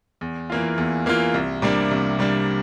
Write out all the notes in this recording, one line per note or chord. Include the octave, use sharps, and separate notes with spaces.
E2
E3 A#3 F4
E2
E3 A#3 F4
C2
C3 G3 A#3 D4
C2
C3 G3 A#3 D4